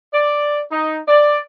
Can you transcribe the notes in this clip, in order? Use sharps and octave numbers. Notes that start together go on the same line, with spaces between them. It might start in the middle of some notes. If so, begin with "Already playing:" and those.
D5
D#4
D5